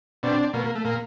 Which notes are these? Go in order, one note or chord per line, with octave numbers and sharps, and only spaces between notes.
B2 C4 D4
B2 A#3
A#3
A3
A#2 A#3